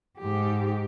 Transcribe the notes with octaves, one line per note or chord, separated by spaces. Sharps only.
G#2 G4